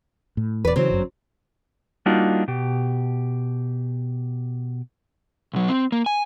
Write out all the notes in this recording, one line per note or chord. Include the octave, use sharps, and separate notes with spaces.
A2
E1 E2 B4 D5
C#3 E3 F#3 C4
G1 F#2
G3 A#3 D4 D#4 F4 F#4
B2 G4
B1 F#3
C4
A#3
G#5